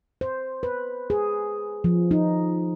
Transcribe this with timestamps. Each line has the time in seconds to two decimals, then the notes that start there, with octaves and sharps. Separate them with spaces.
0.21 C5
0.63 B4
1.10 G#4
1.84 F3
2.11 D#4